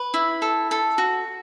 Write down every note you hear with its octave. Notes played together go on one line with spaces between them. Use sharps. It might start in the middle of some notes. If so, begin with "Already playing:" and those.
Already playing: B4
E4
A4
A4
F#4